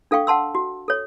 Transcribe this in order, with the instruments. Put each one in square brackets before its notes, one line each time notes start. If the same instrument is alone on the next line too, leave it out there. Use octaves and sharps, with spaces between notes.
[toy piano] D4 A4 F5 G5 C#6
F#5 A5 C6 E6
F#4
A4 C#5